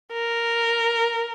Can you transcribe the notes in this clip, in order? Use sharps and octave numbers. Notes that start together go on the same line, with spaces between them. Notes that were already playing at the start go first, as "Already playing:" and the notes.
A#4